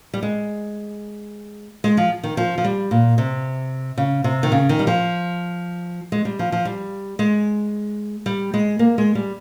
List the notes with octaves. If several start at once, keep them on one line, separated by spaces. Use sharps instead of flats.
G3
G#3
G#3
F3
D#3
F3
F3
G3
A#2
C3
C#3
C3
D#3
C#3
D#3
G3
F3
G#3
G3
F3
F3
G3
G#3
G3
G#3
A#3
G#3
G3